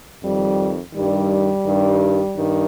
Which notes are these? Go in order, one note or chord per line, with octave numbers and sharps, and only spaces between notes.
F2 D#3 G3
G2 D#3 G3
G2 D#3
G2 D#3